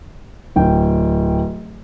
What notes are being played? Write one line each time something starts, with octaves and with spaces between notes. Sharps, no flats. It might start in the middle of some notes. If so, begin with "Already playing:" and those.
D1 G5